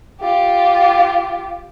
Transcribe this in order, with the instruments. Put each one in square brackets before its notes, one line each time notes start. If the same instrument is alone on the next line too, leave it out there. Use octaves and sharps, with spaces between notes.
[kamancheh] F4 G4